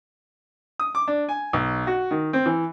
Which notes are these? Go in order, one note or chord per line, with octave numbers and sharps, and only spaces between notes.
D#6
D6
D4
G#5
B1
F#4
D#3
C4
E3